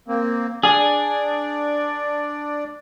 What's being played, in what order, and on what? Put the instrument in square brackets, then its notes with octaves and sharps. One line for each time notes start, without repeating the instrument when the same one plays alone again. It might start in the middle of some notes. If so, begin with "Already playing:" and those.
[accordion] A#3 C4
[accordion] D4 D5 [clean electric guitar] G#4